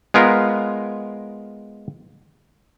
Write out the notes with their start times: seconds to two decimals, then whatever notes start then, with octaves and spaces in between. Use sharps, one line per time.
0.14 G#3 B3 F4 A#4